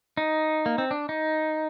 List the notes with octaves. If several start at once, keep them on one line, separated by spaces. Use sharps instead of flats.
D#4
A#3
C4
D4
D#4